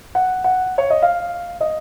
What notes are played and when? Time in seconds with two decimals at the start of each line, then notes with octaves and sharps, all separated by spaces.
0.15 F#5
0.44 F#5
0.78 C#5
0.90 D#5
1.02 F5
1.61 D#5